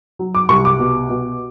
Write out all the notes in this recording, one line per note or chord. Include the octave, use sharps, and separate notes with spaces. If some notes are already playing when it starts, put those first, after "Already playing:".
F#3
D6
C2 C#6
D6
B2
B2